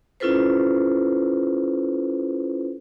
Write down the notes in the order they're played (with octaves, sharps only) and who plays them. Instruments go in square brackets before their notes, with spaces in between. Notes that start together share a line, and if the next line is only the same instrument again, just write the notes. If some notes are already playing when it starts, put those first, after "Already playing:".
[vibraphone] C#4 E4 F4 A4 B4 C5